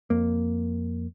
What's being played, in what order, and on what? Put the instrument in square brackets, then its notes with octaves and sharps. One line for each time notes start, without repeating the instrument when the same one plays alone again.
[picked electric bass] F2 A#3